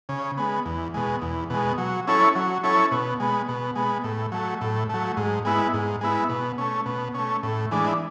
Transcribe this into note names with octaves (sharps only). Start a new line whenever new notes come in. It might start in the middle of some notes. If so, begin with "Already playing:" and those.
C#3
G#3 B3
E2
B2 G#3
E2
B2 G#3
F#3
C#4 E4 A4 C#5
F#3
C#4 E4 A4 C#5
B2
G#3 B3
B2
G#3 B3
A2
F#3 A3
A2
F#3 A3
G#2
G#3 B3 E4
G#2
G#3 B3 E4
B2
A3 C#4
B2
A3 C#4
A2
E3 G#3 D4